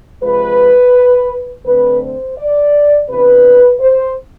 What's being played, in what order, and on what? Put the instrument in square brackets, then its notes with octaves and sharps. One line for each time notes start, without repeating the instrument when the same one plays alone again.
[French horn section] C3 F3 G#3 B4
D3 A3 C4 B4
C5
D5
C3 E3 B3 D4 B4
C5